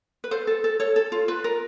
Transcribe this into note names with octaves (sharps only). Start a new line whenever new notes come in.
B4
A4 C5
A4
A4
A4 C#5
A4
F4
F4 B4
A#4